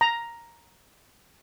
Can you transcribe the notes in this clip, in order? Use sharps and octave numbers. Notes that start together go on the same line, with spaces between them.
A#5